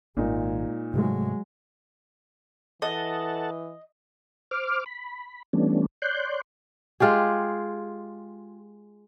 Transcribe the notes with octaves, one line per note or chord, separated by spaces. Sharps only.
G#1 A#2 G#3 D#4
G#2 C3 F#3 G#3 A3
E3 A4 D#5 F#5 A5
C5 D6 F6
B5
E3 G3 A3 B3 C#4 D4
C#5 D5 C6 F#6 G6
G#3 F4 G4 G#4